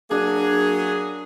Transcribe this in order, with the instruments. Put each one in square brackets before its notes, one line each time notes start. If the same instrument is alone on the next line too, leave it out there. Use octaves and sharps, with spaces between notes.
[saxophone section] F#3 A#3 G#4 [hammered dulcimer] D4